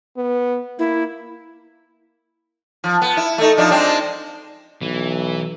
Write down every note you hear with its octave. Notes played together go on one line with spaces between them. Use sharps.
B3
A#3 E4
F3
B3
E4
A3 D#4
F3 D4 D#4
G#3 C4 D4
B1 E3